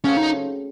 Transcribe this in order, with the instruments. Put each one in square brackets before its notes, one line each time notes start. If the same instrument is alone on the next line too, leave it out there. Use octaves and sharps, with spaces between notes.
[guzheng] C#3 F#3 A3 C4 [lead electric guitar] C#4
[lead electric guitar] D#4